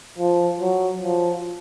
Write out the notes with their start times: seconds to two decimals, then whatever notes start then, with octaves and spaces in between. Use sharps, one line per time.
0.18 F3
0.60 F#3
1.02 F3